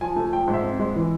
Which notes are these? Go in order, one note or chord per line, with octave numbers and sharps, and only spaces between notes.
F3 G#5
A3
F3 G5
G#2
E5
C4
G#3
E3